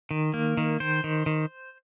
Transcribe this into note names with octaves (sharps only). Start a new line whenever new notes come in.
D#3
A#3
D#3
D#3 C5
D#3
D#3